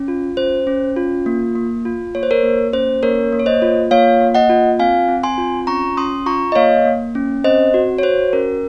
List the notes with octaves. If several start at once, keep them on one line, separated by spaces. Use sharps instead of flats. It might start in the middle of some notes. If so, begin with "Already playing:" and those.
Already playing: C#4
F4
C#4 C5
C#4
F4
A#3
A#3
F4
A#3 C#5
C5
A#4 C#5
A#3
C#4 C5
A#3 A#4 C#5
A#3
C#5
C5 D#5
F4
A#3 C#5 F5
A#3
D#5 F#5
F4
C4 F5 G#5
C4
G#5 C6
F4
C#4 A#5 C#6
C#4 C6 D#6
F4 A#5 C#6
D#5
A#3 C#5 F5
A#3
C#4
C4 C5 D#5
F#4
C#5
F#4 C5
C#4 A#4